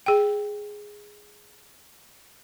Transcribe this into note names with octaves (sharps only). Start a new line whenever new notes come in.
G#4 G5